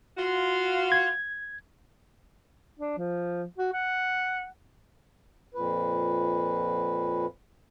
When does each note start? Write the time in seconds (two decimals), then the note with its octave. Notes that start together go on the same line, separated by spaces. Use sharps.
0.18 F4 F#4
0.92 G#6
2.80 D4
2.98 F3
3.58 F#4
3.73 F#5
5.54 F2 A#2 B4